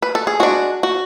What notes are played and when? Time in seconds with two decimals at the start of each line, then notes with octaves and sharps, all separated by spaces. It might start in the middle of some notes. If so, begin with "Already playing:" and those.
0.02 B4
0.15 A4
0.27 G#4
0.40 G#3 D4 F#4
0.83 F#4